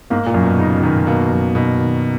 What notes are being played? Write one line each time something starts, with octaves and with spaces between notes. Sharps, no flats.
G#2 A#3
A#2
F#2
B2
C#3 D#4
B2 D#3
B2 A#3
F#2
B2 D#4
D#3